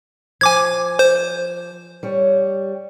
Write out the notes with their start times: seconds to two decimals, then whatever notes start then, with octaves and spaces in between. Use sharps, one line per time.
0.41 F3 G#5 D6 G#6
0.99 C5
2.03 G3 C#5